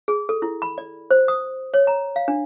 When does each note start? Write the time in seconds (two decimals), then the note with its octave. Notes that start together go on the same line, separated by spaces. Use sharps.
0.08 G#4
0.29 A4
0.42 E4
0.62 B5
0.78 D5
1.11 C5
1.28 D#6
1.74 C#5
1.87 A#5
2.16 F5
2.28 D4